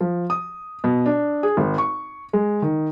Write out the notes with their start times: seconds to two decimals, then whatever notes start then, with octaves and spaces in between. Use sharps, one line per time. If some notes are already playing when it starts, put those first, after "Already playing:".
0.01 F3
0.30 D#6
0.84 B2
1.06 D4
1.43 G#4
1.57 G#1
1.78 C#6
2.33 G#3
2.62 D#3